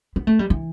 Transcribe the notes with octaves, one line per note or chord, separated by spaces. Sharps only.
B3
A3
G3
E3